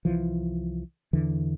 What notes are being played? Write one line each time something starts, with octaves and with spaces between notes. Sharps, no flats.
C2 E3 F3
E2 D3 E3